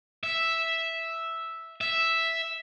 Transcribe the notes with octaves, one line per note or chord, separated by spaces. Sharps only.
E5
E5